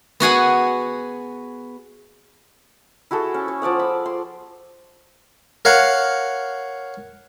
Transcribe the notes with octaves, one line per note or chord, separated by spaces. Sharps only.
B3 F#4 G#4 F#5
E4 F#4 G#4 A4
C#4
C#5
F3 D5 F#5 D#6
B5
C6
A#4 C#5 F5 F#5